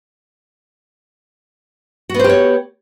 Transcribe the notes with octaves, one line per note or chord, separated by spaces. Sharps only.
B3 F#4 G4 C5 C#5